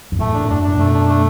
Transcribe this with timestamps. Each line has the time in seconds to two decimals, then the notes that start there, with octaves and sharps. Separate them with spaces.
0.12 F#2
0.19 E2 A2 A3
0.34 D4
0.40 A2
0.49 F#2 D4
0.63 A2 D4
0.78 F#2 B2 A3
0.94 D4
1.09 A3